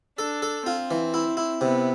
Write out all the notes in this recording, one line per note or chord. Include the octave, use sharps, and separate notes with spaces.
D4 A4
A4
C4 F4
E3
E4
E4
C3 B3